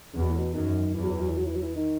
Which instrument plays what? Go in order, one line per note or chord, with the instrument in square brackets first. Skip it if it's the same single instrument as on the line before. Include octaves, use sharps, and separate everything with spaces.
[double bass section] E2 [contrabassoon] C#3
[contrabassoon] B2
A2
B2
[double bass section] F#2 [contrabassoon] D#3
[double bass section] E2 [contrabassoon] E3
[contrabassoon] F#3
E3
F#3
E3
F#3
E3
F#3
E3
D#3